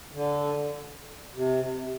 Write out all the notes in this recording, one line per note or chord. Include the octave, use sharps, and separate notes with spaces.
D3
C3